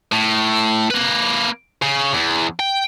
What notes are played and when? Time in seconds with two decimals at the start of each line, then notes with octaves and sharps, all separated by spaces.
0.12 A2
0.90 A#3 B4
1.82 C#3
2.14 E2
2.60 G5